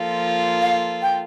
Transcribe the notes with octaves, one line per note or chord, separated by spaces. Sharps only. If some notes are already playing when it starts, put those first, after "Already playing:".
Already playing: F3 A#3 F4 A4
F5
G5